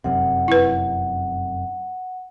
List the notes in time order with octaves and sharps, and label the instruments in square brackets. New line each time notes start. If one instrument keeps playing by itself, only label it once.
[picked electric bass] F1 F#2 C3 [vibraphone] F#5
[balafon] E4 B4